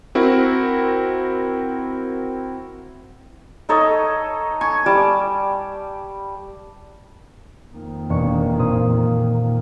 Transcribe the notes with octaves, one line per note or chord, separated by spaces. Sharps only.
C4 E4 F#4 A#4
D#4 A4 C#5 D#5
G#5 C#6
G3 G4 A5 D6
F2 D#3 A#3
E1 C#6
A#2 C5 D#6